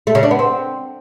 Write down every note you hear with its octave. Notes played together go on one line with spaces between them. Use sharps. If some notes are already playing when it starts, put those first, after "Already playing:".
A3
C#3
D4
B3
C4